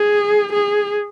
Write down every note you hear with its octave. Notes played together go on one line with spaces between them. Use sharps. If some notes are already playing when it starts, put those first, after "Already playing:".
Already playing: G#4
G#4